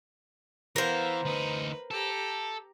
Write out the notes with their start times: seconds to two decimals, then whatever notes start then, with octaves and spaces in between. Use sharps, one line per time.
0.76 E3 B3 A#4 C5 F5
1.25 D2 D#4 B4
1.91 G4 A4 A#5